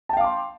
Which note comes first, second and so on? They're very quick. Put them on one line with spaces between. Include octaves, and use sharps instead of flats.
A5 G5 F5 D6 C6